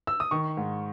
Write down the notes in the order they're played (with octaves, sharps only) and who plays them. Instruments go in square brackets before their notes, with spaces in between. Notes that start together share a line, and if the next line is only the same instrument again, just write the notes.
[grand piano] E6
D#6
D#3 C#6
G#2